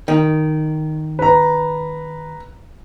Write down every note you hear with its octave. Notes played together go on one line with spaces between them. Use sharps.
D#3
B4 A#5